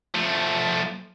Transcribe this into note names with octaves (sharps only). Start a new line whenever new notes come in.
F3 A3